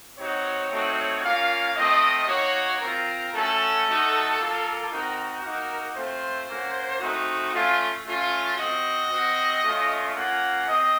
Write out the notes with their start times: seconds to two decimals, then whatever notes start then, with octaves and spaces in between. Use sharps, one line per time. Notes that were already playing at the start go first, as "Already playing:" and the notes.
0.18 C4 D#4 F#4 C#5
0.70 A3 C4 D#4 F#4
1.23 A#3 C#4 F4 F5
1.76 A3 C4 F4 D#5
2.28 A#3 D#4 F#4 C#5
2.81 C4 F4 A#4
3.33 A3 C#4 F#4 A4
3.86 A3 D#4 F#4
4.38 A#3 F4
4.91 C4 D#4 F#4 A#4
5.42 A#3 D#4 F#4
5.95 A3 C4 F4 C5
6.48 A#3 C#4 F#4
7.00 A3 C4 D#4 F#4
7.53 A3 C#4 F4
8.05 A3 C#4 F4
8.57 C4 F#4 D#5
9.10 C4 F#4
9.62 A3 C#4 F4
10.15 A#3 C#4 F4 F#5
10.67 C4 D#5